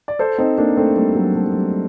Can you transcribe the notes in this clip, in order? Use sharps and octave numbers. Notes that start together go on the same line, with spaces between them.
D5
A4 C5
C4 D#4
A#3 D4
A3 C4
G3 A#3
F#3 A3
F#3 A3
F#3
G3